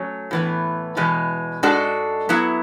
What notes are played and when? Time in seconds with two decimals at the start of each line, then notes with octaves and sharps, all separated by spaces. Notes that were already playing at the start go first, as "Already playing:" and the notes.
Already playing: F#3 A3 C#4
0.31 A2 E3 B3
0.97 E2 B2 G#3 B3
1.63 G#2 G#3 D4 F#4 A4
2.29 F#3 B3 E4